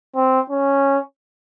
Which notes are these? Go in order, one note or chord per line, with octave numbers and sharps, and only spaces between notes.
C4
C#4